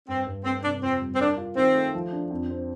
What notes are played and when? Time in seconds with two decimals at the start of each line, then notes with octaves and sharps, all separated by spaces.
0.08 G2 C4
0.27 G2
0.44 A3 C4
0.63 C3 D4
0.82 F2 C4
1.01 G3
1.14 C4
1.20 D4 A#4
1.37 F4
1.56 D#3 C4
1.75 A3
1.94 F3
2.13 D4
2.30 F2
2.50 C4